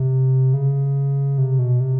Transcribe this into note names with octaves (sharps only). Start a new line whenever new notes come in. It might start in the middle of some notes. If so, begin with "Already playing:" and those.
Already playing: C3
C#3
C3
B2
C3